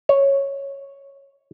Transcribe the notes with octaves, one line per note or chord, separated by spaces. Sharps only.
C#5